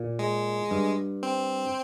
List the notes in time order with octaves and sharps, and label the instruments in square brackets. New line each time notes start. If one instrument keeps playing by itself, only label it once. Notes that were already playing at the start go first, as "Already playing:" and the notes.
Already playing: [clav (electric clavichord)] A#2
[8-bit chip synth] G#3
[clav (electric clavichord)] G2
[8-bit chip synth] C4